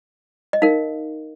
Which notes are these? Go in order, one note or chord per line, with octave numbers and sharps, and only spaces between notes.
D#5
D#4 A#4 F5